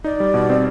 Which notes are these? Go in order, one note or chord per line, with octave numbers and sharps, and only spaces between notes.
D#4 D5
G3
B2
C4